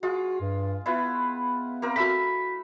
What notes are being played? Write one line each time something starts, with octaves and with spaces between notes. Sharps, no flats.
G#3 F4 F#4
G2
B3 E4 F4 B4
A#3 C4 A#4
A3 F#4 B5 E6 B6